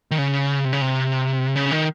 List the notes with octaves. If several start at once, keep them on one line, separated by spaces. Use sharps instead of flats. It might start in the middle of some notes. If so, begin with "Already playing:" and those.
D#3
C#3
C3
C#3
C3
C#3
D#3